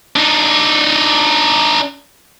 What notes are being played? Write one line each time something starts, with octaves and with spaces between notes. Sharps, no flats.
D4 D#4